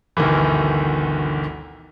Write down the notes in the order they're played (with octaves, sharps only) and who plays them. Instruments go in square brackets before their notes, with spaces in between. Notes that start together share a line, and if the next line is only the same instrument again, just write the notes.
[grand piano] G1 D2 B2 D#3 E3